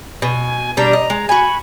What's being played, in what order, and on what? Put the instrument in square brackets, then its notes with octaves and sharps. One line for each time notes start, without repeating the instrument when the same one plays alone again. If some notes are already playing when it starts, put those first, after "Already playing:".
[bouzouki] B2 [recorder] G#5
[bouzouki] B2 G3 D4 [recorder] A#5
[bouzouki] D#5
G#3
[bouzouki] F#4 G#5 [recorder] B5